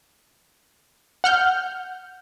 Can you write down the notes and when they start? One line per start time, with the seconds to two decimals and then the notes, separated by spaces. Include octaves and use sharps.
1.24 F#5 F6 G6